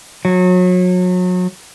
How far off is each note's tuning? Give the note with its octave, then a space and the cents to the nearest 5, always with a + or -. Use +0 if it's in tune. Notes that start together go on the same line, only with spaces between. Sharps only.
F#3 -30